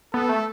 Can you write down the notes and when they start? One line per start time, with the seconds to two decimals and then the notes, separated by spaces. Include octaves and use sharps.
0.13 B3 A4
0.29 A3